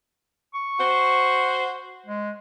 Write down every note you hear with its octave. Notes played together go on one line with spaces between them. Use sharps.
C#6
F#4 C5
G#3